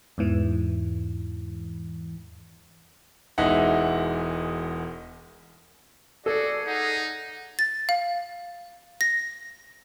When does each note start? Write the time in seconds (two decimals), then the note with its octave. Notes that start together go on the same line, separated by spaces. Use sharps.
0.18 E2 G#2 E3
3.38 E1 E3 G#3 D#4 E5 F#5
6.26 F#4 G#4 A4 D5
6.67 D#4 F#5
7.59 A6
7.89 F5
9.01 A#6